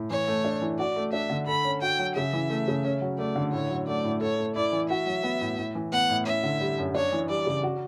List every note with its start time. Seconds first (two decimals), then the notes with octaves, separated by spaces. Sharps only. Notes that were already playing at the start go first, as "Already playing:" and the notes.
Already playing: A2
0.10 E3 C#5
0.28 A3
0.45 D4
0.62 E3
0.79 F#4 D5
0.96 A3
1.13 D4 E5
1.30 D3
1.47 A4 B5
1.65 C#4
1.82 F#4 G5
1.99 F#3
2.15 C#3 E5
2.33 E3
2.50 A3
2.68 C#3
2.85 C#4
3.01 F#3
3.18 A3 D5
3.36 D3
3.52 A2 C#5
3.70 F#3
3.87 A3 D5
4.04 A2
4.21 A4 C#5
4.38 A3
4.56 E4 D5
4.72 E3
4.90 F#4 E5
5.06 F#3
5.23 B3
5.41 A2
5.59 A2
5.75 E3
5.92 B3 F#5
6.09 A2
6.26 C#4 E5
6.43 D3
6.61 G3
6.78 F#2
6.95 D4 C#5
7.12 E3
7.29 G3 D5
7.46 C#3
7.63 F#4